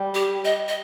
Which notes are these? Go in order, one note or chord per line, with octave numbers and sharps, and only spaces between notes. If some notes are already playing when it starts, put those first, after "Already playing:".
Already playing: G3
G4
D#5
D#5